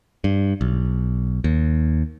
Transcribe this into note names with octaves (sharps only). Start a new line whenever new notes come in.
G2
B1
D#2